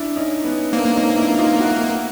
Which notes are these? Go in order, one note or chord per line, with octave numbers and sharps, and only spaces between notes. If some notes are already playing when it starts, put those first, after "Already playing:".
Already playing: D4 E4
C#4 D#4
B3 C#4
A#3 C4 D4
C#4 D#4
D4 E4
D#4 F4
E4 F#4